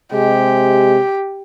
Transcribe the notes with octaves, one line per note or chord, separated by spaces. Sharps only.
C3 G#3 G4